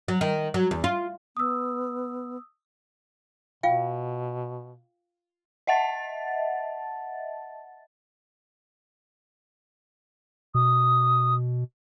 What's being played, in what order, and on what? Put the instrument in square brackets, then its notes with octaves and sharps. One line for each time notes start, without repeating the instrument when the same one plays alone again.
[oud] F#3
D#3
F#3
E2
F4
[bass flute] B3 [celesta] D#6 E6
[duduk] B2 [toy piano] F4 F5 G5
[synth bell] D#5 E5 F#5 A5 A6
[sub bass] B2 [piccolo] D#6